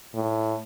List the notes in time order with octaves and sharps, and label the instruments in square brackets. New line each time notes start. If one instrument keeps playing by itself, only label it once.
[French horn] A2